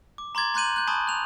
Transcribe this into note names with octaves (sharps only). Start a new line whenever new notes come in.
D6
A#5 C6 D6 G#6 A6
A#5 C6 F#6 G6 D#7 F#7
F#6 G6
G#5 A5 B5 C#6 D#6
F#6 F7